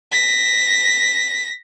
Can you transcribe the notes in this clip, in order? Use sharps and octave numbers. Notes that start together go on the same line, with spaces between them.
A#6 B6